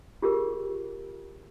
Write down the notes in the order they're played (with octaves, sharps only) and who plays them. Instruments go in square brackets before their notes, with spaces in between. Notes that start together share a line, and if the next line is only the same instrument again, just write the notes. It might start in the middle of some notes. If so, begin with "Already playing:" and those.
[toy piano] F4 G4 G#4 A#4